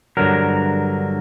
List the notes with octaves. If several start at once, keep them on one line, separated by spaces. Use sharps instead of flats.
G2 D3 F#3 A#4